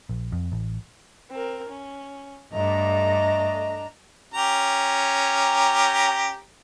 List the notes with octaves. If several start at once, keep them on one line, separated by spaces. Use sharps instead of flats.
A#1
F2
A1
C4 A#4
C#4
G2 A3 D4 D#5 A#5
C#4 G4 A#5